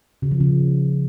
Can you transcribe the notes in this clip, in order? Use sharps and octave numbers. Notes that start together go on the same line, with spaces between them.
C#3
F3
C#3